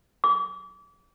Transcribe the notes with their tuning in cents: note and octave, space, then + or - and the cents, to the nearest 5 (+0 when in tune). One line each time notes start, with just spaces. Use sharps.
D6 -35